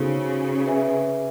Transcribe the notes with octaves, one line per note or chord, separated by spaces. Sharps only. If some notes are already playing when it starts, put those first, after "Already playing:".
Already playing: C#3 B3 D#4 F#4 A4 C5
G#4 B4 E5 G#5